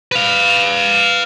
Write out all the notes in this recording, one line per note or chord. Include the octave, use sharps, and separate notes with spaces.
B4 F5